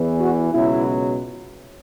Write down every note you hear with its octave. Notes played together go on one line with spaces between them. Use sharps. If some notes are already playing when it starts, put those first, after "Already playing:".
Already playing: E2 E3
F#4
C#2 B2 F#3 E4